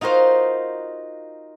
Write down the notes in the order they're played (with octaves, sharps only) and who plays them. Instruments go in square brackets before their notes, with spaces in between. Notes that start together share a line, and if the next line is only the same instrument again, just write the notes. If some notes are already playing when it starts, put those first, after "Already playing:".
[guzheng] D#4 F4 F#4 A#4 C5